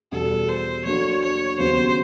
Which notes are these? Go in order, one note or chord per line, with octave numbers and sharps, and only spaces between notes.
E2 B2 G3 A4
C5
F#3 A#3 D4 F#4 A4 C#5
C#5
D#2 C#3 F#3 B3 C5